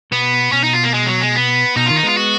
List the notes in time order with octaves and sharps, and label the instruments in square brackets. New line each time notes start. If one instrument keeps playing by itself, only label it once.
[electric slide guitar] B2 [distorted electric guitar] B3
[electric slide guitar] B2 [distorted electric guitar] C#4
[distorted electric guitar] D#4
F4
A#3
G#3
F#3
G#3
B3
[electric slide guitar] B2 [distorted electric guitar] D#4
[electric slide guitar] D#3 [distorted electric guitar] F4
[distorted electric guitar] D#4
[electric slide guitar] G#3 B3 [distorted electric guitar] F4
[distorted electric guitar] F#4